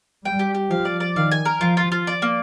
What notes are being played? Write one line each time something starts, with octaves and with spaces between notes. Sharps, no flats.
G3 G5
G4
G4
F3 F5
D5
D5
D#3 F5
G#5
A#4
F3 F4
F4
F4
D5
A#3